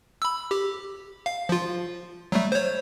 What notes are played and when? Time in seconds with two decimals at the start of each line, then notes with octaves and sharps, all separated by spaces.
0.22 B5 E6
0.51 G4
1.26 F5
1.49 F3 F4
2.32 F#3 G3 A3
2.52 C5 C#5